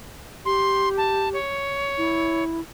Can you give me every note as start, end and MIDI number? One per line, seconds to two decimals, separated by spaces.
0.45 1.38 67
0.45 0.89 84
0.97 1.29 81
1.33 2.44 73
1.97 2.60 64